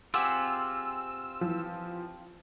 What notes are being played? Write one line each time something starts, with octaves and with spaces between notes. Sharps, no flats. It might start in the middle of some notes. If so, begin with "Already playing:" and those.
C4 F4 G4 G#4 F#5 E6
E3 F3